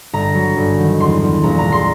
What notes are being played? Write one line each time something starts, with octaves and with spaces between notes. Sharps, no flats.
G1 A#5
F#3
G1
D#3
E2 C6
E2
A#1 A#5
A#5
G#3
C6